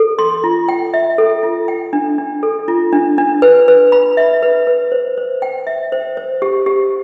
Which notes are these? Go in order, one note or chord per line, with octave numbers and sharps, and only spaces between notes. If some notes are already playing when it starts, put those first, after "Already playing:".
Already playing: A4
C6
F4
G5
E5
A4
F4
G5
D4
D4
A4
F4
D4
D4
B4
B4
B5
E5
B4
B4
C5
C5
G5
E5
C5
C5
G4
G4